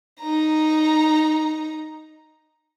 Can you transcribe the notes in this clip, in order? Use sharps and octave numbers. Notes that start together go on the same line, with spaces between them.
D#4 A#5